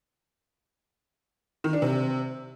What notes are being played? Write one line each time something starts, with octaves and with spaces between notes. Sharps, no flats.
D#3
D4
C3